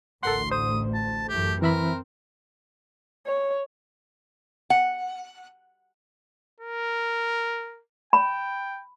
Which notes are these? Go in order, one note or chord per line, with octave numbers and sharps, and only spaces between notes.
A1 D2 A4 A#4 F#5 C6
C5 D#6
A5
F#2 E3 A3 G4
E3 C4 A#4 E5 B5
C#5
F#5
A#4
G5 B5